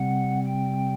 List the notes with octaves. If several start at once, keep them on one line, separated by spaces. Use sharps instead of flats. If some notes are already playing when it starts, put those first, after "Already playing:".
Already playing: C3 G3 C4 F#5
G5